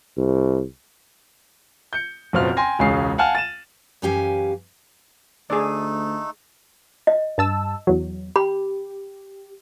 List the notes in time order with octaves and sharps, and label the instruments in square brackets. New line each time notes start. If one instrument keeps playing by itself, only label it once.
[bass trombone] C2
[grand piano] G6 C#7
F#1 B2 C4 F4 F6
G5 G#5 C6 A#6
E1 C#2 C#4 G#4 F5 C7
F5 F#5 G#5 A5 F6
A6 D#7 E7
[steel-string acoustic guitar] F#2 E3 C#4 G4 F5 G#5
[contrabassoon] D2 [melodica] A3 D#4 A4 [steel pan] G#4 D5
[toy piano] D#5
[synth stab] G2 A5 E6
E2 F#3
[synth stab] G4 [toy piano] B5